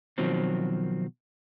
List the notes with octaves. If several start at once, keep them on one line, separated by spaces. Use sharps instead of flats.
B2 D#3 F3 F#3 C4